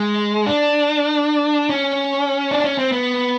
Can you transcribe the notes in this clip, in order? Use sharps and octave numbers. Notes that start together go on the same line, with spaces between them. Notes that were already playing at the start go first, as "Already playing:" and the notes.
Already playing: G#3
D4
C#4
D4
C#4
C4
B3